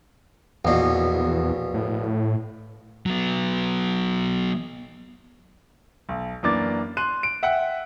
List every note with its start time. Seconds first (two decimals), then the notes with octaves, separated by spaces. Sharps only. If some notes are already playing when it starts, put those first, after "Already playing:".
0.65 A#1 E2 B2
1.74 A2
3.06 F#3 B3
6.09 B1
6.43 F#2 E3 A#3 D4 D6 A6
6.97 C6 F#6 D#7
7.23 D7
7.43 E5 F#5 G5 F#6